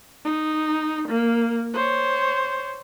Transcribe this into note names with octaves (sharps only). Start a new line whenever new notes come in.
D#4
A#3
C5 C#5